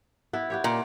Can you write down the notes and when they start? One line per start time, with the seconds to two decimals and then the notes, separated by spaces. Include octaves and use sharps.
0.33 B3 E4
0.50 B3 G4 C#5
0.64 A#2